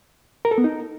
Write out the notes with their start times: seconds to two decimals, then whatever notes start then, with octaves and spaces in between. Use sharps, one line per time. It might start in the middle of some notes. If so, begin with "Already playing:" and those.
0.45 A#4
0.51 A4
0.58 B3
0.64 D#4